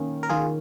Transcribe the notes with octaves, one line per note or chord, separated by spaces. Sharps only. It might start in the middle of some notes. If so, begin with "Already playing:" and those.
Already playing: D#3 A#3 C#4
A#4
D#3 F4 G#4